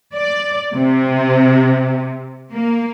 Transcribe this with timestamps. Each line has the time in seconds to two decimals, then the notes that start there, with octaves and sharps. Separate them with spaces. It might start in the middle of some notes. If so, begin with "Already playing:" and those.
0.15 D5
0.75 C3
2.51 A#3